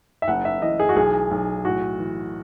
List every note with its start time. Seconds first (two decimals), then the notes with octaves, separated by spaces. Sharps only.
0.22 E5
0.28 F#1 F#5
0.45 E5
0.62 E3 D#5
0.79 G#4
0.89 F#4
0.96 B1 G#4
1.31 B1
1.65 A2 F#4
1.99 E3